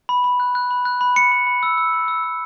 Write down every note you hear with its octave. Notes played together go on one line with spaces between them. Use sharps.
B5
B5
F#6
F#6
B5
F#6
B5
B5 C#7
B5
B5
E6
E6
B5
E6
E6